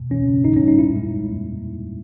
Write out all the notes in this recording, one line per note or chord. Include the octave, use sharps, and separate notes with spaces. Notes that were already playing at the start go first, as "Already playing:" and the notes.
Already playing: B2
E3 C#4
C#3
G#2 D#4
C#4
G3
D#4
A#2 E4
G#3